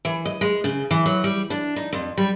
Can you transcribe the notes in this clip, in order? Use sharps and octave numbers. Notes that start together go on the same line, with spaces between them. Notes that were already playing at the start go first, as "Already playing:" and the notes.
E3
D#5
G#3
C#3
E3
F#3
G3
D4
D#4
F2
G3